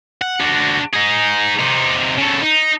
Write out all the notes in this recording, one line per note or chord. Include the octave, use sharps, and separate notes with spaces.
F#5
D4 F#4
D#4 G#4
C3 D#4
C#3 A4
D#4